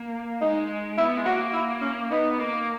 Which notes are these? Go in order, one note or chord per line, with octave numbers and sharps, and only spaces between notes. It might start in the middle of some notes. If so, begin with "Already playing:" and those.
Already playing: A#3
G#3 D#4
B3 E4
G#3
A#3 F#4
E4
C#4
B3 D#4
A#3